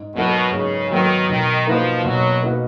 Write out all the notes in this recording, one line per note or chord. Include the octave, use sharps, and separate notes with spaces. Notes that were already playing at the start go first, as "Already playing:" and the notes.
Already playing: G#2
B2 F#3 B3 F#4 A#4
G#2 C#3
D#3 F#3 B3 F#4 A#4
B2 D#3
F3 A#3 D#4 F#4 B4
B2 F#3
A#3 D#4 F#4 B4